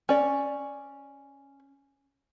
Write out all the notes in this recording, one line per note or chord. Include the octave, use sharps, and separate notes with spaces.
C#4 D5